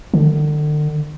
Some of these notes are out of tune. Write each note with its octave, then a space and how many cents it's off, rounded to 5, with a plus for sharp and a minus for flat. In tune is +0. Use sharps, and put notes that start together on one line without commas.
D3 +35